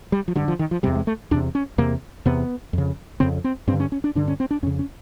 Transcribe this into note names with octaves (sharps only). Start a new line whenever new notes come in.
G3
F3
G2 D3 F#3
F3
D#3
F3
E2 C3 G3
G#3
A3
E2 C3 D4
C#4
E2 C3 A#3
E2 C3 B3
F2 C#3
F2 C#3 C4
C4
G2 C4
D3
C#4
C#4
D4
G2 D3 D4
C#4
C4
D4
F2 C#3 C#4
C#4